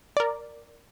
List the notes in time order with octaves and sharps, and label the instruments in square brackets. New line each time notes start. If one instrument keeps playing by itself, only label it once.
[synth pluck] A#4 D5